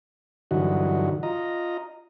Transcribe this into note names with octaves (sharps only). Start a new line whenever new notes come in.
G2 D3 E3 F#3 D#4 F#4
F4 D#5 A#5